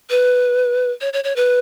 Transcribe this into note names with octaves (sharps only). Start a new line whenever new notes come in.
B4
C#5
C#5
C#5
B4